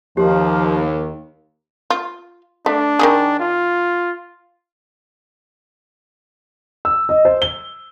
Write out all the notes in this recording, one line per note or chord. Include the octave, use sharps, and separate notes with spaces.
D#2 F3 A#3 G4
F4
A3 D4
D#3 E3 G#4
F4
E6
D#5
C5
G7